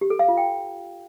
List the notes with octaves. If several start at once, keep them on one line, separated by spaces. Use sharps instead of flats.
G4
A4
F5
F4
G5